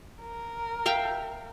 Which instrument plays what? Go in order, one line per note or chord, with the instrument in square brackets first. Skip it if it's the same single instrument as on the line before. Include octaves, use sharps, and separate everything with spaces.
[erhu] A#4
[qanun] E5 F5 G5